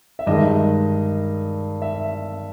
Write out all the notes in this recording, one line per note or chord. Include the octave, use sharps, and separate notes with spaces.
E5
G2 D#3 G#3 D#5
E5